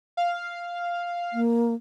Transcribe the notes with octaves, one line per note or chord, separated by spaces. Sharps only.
F5
A#3